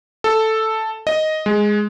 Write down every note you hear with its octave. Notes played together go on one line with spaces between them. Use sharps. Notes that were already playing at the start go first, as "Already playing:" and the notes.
A4
D#5
G#3